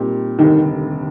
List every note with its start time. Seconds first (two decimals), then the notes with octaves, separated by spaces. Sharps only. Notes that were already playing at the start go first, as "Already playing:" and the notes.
Already playing: A#2 G3 C4 D#4 G4
0.38 F1 D#2 D3 D#3 G3